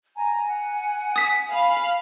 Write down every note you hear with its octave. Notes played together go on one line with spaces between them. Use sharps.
G#5 A#5
F#5
D#6 B6
F5 B5